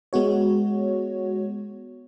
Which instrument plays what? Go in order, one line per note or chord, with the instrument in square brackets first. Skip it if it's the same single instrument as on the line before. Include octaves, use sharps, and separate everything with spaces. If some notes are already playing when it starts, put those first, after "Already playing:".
[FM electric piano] G#3 B3 F#4 C#5